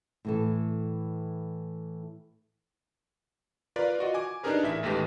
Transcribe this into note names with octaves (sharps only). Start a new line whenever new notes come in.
A2 E3 A4
F4 A#4 B4 D5
F4 F#4 D#5
G#5 D6
D4 D#4 G4 G#4 A#4 B4
A1 E4 E5 B6
A1 D#2 G#3 A3 G4 B4